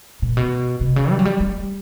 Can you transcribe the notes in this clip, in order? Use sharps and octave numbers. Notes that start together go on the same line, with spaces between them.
A#2
B2
C3
C#3
G3
F#3
G3
G3